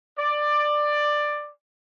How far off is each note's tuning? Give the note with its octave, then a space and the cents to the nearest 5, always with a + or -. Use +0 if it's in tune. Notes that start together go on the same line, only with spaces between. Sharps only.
D5 +15